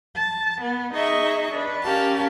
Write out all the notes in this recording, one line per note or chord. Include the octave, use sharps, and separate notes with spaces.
A5
B3
D#4 G#4 D#5 E5 C#6
D4 B4
C#4 G4 A#4 F5 A5